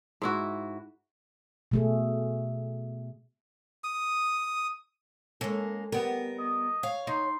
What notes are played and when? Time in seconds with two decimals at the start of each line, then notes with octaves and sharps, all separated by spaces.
0.22 G#2 E4 F#4
1.71 B2 A3 G#4
3.84 D#6
5.41 G#3 A#3 C#4 A4
5.92 G3 B3 A#4
6.39 D#5
6.83 C#5 F5
7.07 D#4 C6